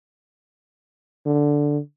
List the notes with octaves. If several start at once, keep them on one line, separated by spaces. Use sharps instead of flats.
D3